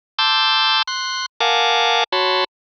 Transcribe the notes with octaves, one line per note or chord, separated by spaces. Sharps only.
A5 C6 D6 E6 G6
C6 F#6
A#4 F5 F#5 G#5 A5 D6
F#4 C#5 A5 B5 C6